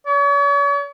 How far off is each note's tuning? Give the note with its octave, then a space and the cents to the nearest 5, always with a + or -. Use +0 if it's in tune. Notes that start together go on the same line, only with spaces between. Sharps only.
C#5 +40